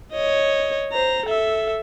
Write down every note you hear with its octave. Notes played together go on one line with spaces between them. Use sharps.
C#5 D#5
C5 A#5
A4 E5